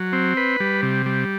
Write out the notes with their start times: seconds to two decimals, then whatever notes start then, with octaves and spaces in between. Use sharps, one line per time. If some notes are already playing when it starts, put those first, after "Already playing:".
Already playing: F#3
0.13 C4
0.37 B4
0.60 G3
0.83 C3
1.06 G3